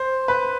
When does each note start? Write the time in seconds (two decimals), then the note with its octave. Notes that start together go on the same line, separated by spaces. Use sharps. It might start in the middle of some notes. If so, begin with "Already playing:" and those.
Already playing: C5
0.28 B4